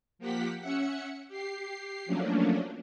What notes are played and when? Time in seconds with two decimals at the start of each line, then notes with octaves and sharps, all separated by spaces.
0.19 F3 A#3 G4 F#5 B6
0.60 C#4 E5 F#5 C#7
1.28 G4 C7
2.05 F3 F#3 A3 A#3 C#4 D4